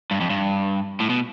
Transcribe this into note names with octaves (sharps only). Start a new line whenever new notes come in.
G2
F2
G2
A2
B2